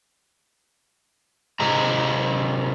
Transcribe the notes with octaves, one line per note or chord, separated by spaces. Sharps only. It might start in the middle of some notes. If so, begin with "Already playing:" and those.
C3 G#3 G#4 D#5 A#5